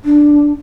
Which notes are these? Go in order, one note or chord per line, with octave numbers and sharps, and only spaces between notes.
D4